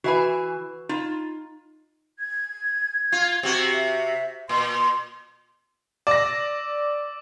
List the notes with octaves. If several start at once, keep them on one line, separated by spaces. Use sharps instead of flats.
E3 F#4 B4 E5 G#5
D#4 F4
G#6
F4
C3 F#4
E5
A#2 C6
D5 D6 E6 A#6